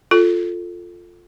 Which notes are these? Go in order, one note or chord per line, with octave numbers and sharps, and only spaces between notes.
F4 A4